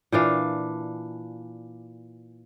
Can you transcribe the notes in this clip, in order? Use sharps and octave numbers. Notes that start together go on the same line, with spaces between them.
A#2 E3 D4 F5